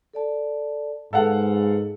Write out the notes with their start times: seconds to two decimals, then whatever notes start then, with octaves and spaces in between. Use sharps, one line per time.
0.13 A4 D5 A5
1.13 G#2 G#4 A4 B4 F5 F#5 A5